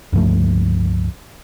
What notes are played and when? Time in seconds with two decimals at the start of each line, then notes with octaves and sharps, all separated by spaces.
0.13 C#2 G2 F3 A3